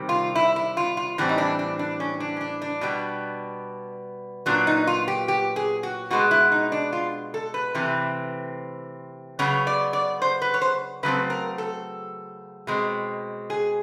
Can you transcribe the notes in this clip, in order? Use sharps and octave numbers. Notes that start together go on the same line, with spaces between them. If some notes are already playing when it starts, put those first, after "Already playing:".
Already playing: C3 D#3 G3 C4
F4
E4
E4
F4
F4
A2 E3 G3 C4 F#4
D#4
D4
D4
D4
C#4
D4
C#4
D4
D4
B2 G3 B3
A#2 F#3 B3 D4
D#4
F4
G4
G4
G#4
F#4
B2 G#3 B3 F#4
E4
D#4
D4
F4
A4
B4
C3 E3 A3 C4
C#3 F#3 B3 C#5
D5
D5
C5
B4
C#5
C5
C#3 F#3 A3 C4 B4
A#4
A4
B2 G#3 C4
G#4